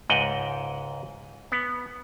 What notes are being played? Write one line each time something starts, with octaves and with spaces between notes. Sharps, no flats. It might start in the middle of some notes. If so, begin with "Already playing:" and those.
C#2 G#2 D#5 F#5 G5
B3